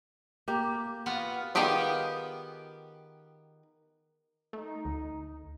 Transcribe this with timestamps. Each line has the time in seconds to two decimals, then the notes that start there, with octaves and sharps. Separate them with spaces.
0.48 A#3 G4
1.06 B3 F4 F#4
1.55 D#3 B3 F4 G4 G#4
4.53 A3 D#4
4.85 D2